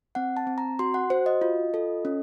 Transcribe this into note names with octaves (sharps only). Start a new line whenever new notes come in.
C4 F#5
A5
C4
A#5
F#4 C6
F#5
F#4 C5
D#5
F4
A4
C#4